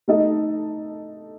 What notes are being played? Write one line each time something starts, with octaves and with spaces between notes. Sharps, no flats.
A3 D#4 A4 D#5